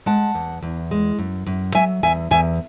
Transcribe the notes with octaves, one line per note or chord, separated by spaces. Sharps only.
G#3 F#5 A5
E2
E2
G#3
F#2
F#2
F#3 E5 G#5
E2 E5 G#5
E2 E5 G#5